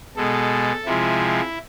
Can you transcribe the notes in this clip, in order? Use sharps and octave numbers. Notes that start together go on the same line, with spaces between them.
B2 G#3 A4
C3 F3 G#3 E4